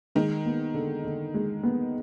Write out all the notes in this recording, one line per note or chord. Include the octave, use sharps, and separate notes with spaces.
D#3 G#3
B3
D3
D3
G#3
B3